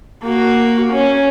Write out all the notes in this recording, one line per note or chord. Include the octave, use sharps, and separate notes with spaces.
A#3 F#4
C#4